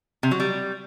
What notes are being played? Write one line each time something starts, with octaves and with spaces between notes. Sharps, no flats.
C3
F#3
G3